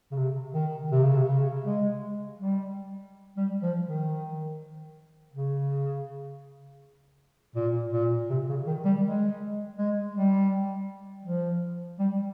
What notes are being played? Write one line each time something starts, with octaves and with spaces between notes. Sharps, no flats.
C#3
C3
D#3
C3
C#3
C3
C#3
G#3
G3
G3
F3
D#3
C#3
A#2
A#2
C3
C#3
D#3
G3
G#3
G#3
G3
F3
G3